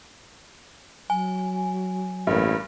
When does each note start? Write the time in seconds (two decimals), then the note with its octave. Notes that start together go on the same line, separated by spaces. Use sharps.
1.10 F#3 G#5
2.27 A1 G2 A#3